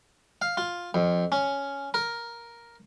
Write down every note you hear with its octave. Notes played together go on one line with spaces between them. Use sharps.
F5
F4
F2
C#4
A#4